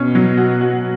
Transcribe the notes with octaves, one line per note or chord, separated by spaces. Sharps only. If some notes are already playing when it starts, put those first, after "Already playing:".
Already playing: B2 C#4
F#3
F#4
F#4